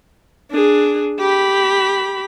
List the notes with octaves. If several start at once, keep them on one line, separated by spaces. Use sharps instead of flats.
D4 G#4
G4 B5